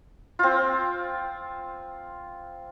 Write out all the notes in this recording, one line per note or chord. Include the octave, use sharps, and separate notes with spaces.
C4 F4